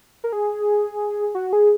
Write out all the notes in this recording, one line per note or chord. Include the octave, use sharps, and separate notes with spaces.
A#4
G#4
F#4
G#4